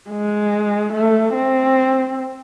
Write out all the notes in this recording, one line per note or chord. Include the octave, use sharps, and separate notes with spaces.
G#3
A3
C4